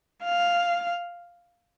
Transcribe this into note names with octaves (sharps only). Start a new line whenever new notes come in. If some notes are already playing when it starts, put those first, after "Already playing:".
F5